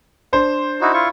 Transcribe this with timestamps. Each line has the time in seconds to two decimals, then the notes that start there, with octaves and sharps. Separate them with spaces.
0.33 D4 C5
0.81 D#4 E4 F#4
0.94 E4 F4 C#6